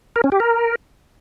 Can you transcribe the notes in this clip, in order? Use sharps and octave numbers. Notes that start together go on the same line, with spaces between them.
A#4
C#4
G4
A#4